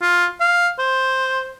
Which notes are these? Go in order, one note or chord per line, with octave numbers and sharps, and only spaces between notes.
F4
F5
C5